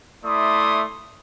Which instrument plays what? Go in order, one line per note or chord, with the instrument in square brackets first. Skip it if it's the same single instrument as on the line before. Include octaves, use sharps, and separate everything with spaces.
[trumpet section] A3 E4 D5 C6 D#6